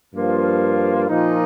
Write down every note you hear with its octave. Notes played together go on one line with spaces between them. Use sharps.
G2 F3 A#3 F4
A#2 F3 A#3 D#4